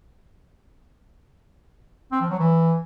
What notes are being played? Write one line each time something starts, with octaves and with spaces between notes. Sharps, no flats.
C4
F3
F#3
E3